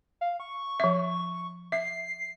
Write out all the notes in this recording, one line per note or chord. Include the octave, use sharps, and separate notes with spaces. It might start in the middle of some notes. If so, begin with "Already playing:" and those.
F5
C#6
F3 E5
E5 C7